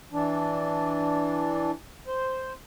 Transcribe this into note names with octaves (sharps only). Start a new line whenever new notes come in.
E3 D4
C5